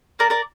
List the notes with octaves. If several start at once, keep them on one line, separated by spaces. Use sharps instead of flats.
A#3 A#4 D5
A#4 D5